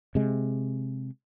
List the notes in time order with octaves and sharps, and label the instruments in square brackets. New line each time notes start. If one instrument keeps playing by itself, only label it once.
[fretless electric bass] C3 G#3